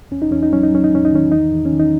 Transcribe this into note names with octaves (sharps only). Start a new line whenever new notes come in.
E2 C#4
D#4
E2 C#4
D#4
F#3 C#4
D#4
F#3 C#4
D#4
E2 C#4
D#4
D#3 C#4
E2 D#4
E2
C#4
D#3
D#4